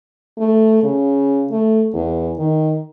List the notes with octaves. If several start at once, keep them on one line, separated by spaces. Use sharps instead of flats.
A3
C#3
A3
E2
D#3